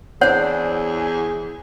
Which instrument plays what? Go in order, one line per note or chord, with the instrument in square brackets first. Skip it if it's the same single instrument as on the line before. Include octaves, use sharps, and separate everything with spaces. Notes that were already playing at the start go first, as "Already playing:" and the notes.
[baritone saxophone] E2 [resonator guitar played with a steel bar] C4 D4 [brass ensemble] G#4 [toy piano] C5 C#5 F#5